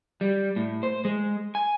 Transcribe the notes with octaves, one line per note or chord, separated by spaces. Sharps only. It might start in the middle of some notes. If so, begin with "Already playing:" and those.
G3
A2
C5
G#3
G#5